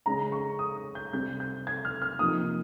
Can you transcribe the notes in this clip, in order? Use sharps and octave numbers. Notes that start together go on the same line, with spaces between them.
C#3 G#3 C#4 A#5
C#6
D#6
G6
C3 G3 C4 G6
G6
G#6
F6
F6
C3 F3 A#3 D#4 D#6